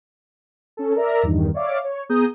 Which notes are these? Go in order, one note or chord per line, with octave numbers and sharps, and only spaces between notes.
C#4 A4
A#4 D5 E5 A#5
E2 G2 D#3
C#5 D5 E5 F5 D6
C#5
B3 G#4 A#5 D#6 G6